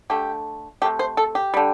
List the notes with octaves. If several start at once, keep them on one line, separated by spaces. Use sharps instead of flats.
D3 A3 G4
C3 A3 G4
C5
A4
G4
D3 G3